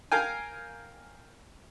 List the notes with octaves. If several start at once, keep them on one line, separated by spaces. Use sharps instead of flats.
A#4 F5 G5 G#5